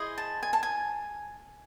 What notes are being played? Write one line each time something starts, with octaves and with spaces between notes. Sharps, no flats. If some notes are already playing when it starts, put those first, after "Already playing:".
Already playing: E4 G#4 C5 D#5
A5
G#5
A5
G#5